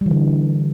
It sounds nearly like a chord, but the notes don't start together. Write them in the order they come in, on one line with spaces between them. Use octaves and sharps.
G3 E3 D3